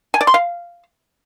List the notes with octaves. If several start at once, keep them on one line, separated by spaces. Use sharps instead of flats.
G#5
D5
C6
F5